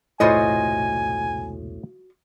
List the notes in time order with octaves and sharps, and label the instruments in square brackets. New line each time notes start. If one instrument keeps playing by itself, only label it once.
[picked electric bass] E1 C2 [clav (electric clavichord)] A2 C5 [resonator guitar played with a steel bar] F4 F#4 D#5 [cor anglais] G#5